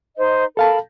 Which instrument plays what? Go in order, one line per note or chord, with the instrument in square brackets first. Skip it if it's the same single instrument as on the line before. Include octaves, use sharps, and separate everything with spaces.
[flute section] D#4 C5 D#5
[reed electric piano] A4 F5 A5 [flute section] A#4 B5